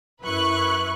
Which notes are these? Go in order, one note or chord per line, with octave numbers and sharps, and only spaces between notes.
F#2 E4 B4 C#6 F#6